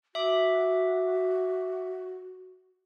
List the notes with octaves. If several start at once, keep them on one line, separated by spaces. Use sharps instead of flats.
F#4 E5 D6